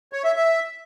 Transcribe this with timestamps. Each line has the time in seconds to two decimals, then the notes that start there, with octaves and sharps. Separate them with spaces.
0.13 C#5
0.24 E5
0.36 E5